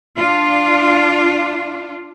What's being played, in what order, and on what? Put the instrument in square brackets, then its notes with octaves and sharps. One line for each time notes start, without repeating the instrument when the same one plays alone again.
[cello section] D4 F4